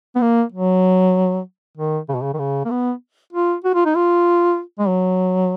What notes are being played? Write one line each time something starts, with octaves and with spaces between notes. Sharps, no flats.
B3
A#3
F#3
D#3
C#3
B2
C#3
D#3
C#3
A#3
B3
F4
F#4
F4
D#4
F4
G#3
F#3